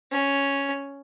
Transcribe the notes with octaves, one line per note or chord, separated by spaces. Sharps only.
C#4